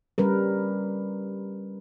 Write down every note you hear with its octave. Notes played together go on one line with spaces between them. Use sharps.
G3 C#4 A#4 B4